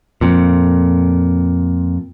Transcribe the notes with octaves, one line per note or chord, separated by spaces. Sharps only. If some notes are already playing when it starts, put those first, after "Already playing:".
F2 A#2